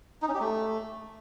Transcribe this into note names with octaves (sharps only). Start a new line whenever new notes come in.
D#4
C#4
G4
A3